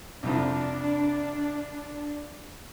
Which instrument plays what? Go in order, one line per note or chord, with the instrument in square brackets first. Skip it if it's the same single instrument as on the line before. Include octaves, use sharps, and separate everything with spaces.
[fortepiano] C2 F2 F3 [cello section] D4